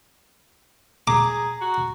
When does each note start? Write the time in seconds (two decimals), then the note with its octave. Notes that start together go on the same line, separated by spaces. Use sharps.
1.07 G#4 A#5 D6
1.61 F#4